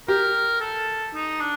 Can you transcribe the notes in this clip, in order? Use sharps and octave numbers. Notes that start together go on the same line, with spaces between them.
G4 A#4
A4
D#4
D4